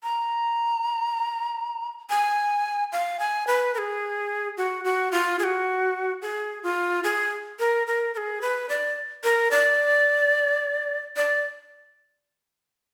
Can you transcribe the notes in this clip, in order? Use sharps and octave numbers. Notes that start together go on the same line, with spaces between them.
A#5
G#5
F5
G#5
B4
A#4
G#4
F#4
F#4
F4
G#4
F#4
G#4
F4
G#4
A#4
A#4
A#4
G#4
B4
D5
A#4
D5
D5